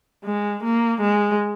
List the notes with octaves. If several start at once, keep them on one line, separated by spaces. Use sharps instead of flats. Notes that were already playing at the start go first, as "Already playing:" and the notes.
G#3
A#3
G#3